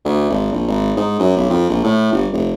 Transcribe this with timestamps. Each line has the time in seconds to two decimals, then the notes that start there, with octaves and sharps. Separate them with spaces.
0.05 D2
0.30 G#1
0.52 A#1
0.68 G#1
0.97 G#2
1.19 F#2
1.37 B1
1.50 F2
1.70 A#1
1.84 A2
2.12 G1
2.33 F1